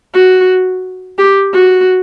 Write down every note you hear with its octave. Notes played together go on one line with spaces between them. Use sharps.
F#4
G4
F#4